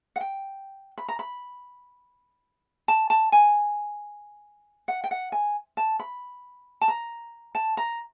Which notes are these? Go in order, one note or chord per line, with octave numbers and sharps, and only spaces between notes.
F#5
G5
B5
A#5
B5
A5
A5
G#5
F#5
G5
F#5
G#5
A5
B5
A5
A#5
A5
A#5